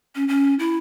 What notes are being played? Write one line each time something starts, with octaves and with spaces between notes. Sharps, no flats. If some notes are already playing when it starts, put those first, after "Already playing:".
C#4
C#4
E4